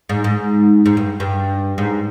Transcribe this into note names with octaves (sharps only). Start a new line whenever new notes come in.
G#2
G#2
G#2
G2
G2
G#2